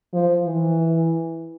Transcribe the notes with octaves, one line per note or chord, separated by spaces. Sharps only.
F3
E3